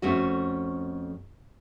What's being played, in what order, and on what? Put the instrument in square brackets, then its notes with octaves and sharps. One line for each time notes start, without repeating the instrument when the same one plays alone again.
[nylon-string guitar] F2 A3 C#4 F#4